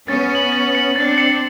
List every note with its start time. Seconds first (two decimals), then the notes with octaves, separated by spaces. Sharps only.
0.08 B3 C#4 A6
0.31 C#7 F#7
0.52 A6
0.75 C#7 F#7
0.96 C4 D4 A6
1.18 C#7 F#7